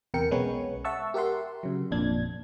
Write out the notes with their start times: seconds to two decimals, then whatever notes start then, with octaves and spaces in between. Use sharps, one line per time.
0.14 E2 C3 A#4 G5 C#7
0.31 B1 G#3 B3 C#4 B4 C#5
0.85 E5 F#5 A5 C#6 E6
1.14 G4 A#4 E5 F#5 C6
1.63 C#3 F#3
1.91 G#1 F2 A#2 D4 G#6